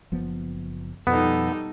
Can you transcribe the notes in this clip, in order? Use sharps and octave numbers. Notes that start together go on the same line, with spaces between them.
F#1 F3 B3
F2 B2 F3 G3 B3 D#4 A4